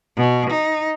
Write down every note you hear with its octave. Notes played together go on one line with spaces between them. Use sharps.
B2
D#4